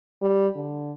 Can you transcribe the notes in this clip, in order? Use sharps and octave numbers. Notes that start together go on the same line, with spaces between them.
G3
D3